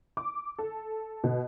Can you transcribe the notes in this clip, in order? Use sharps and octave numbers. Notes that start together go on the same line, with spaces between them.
D6
A4
B2